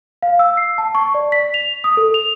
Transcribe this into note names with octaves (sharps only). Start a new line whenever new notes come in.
F5
E6
C7
A5
C#6
D5
B6
F7
D#6
A4
F7